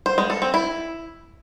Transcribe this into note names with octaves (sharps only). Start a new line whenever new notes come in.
C5
G#3
A4
C4
E4